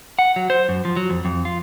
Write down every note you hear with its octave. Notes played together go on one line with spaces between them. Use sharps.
F#5
F#3
C5
F#2
F3
F#3
F2
F2
F4